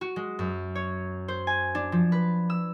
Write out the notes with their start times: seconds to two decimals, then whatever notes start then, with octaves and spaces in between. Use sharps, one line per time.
0.01 F#4
0.16 G#3
0.39 F#2
0.75 C#5
1.28 C5
1.47 G#5
1.75 D4
1.92 F3
2.12 B4
2.50 E6